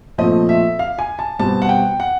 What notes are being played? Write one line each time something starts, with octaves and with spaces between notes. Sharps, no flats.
A#2 F3 A3 C4 D#5
E5
F5
G#5
A5
B2 G3 C4 A5
F#5
G5
F#5